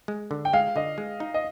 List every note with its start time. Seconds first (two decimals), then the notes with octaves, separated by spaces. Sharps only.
0.08 G#3
0.31 D3
0.45 G5
0.53 G#3 F5
0.76 D3 D#5
0.98 G#3
1.20 D#4
1.34 D#5